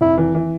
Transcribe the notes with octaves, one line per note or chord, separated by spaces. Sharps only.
F1 E4
E3
E3